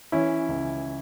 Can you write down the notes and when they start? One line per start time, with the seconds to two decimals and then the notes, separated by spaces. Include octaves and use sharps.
0.12 E3 C#4 E4
0.48 C#2